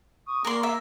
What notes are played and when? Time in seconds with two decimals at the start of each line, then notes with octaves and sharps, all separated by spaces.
0.27 C#6 D#6
0.45 A#3 A#4 D5 A#5 C6
0.63 E5